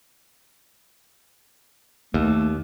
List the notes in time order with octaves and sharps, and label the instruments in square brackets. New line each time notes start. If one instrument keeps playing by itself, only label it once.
[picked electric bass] D#2 [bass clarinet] A3